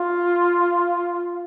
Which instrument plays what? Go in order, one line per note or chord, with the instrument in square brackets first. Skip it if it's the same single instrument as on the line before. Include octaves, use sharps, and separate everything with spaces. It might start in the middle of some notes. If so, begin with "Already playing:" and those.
Already playing: [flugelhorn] F4